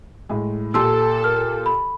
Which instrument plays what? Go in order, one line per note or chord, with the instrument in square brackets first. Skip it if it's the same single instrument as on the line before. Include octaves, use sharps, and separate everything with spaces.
[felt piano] A2 G#3
[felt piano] A#2 G4 C6 [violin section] A4 [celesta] A5 E6
[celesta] A#4 F6
B5